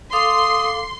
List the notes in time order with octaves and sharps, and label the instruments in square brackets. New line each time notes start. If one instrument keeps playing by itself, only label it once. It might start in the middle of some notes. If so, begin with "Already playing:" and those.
[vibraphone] A4 F5 D6 [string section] C6 [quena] D#6